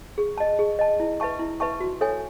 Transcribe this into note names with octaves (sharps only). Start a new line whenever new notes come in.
G#4
D#5 A5
G#4
D#5 A5
E4
B4 E5 A5 C#6
E4
B4 E5 A5 C#6
F#4
A4 C#5 E5 G#5